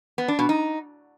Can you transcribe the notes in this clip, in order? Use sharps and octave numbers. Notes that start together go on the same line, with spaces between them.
B3
D4
B2
D#4